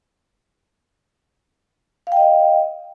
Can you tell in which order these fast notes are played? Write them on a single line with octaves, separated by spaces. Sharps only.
F5 G5 D#5